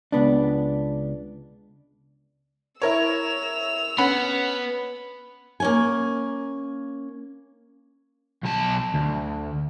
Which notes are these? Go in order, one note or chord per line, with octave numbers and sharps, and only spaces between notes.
C#2 B3 D4
E4 A#4 C#5 E6 F7
B3 C#4 F#5 B5
A#3 C#4 G#5
B1 A5
D2